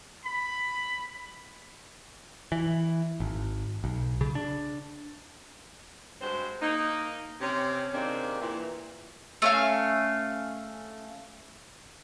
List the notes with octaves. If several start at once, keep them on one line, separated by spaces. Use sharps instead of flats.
B5
E3
G#1
B1
C#3
D4
G2 G#3 C4 F#4 C5
A#3 D#4
C3 C4 C#4
C3 D#3 G#3 A#3 C4 D4
A#2 E3
A3 C#4 F5